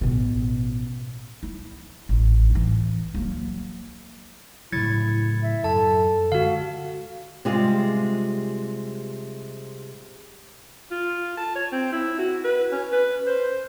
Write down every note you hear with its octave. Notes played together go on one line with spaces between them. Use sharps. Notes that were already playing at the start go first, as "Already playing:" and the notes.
A1 B2
E4
A1
A2 E3
F#3 A#3
A2 C#3 F#3 E4 G#6 A6 C#7
E5
F#2 A4 A5
D3 G#3 F#4 F5
C3 G3 G#3 F4 G#4
F4
A5
C#5
C4
E4
F#4
B4
C#4
B4
C5